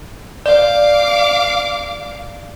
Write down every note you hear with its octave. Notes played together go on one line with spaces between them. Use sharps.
D5 F5 D6